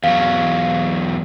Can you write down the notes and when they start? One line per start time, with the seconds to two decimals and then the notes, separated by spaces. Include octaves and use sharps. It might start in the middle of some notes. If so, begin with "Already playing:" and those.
0.04 E2 F#3 F5